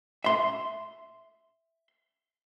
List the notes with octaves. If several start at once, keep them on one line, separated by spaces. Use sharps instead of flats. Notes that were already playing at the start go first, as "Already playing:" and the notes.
E5 C6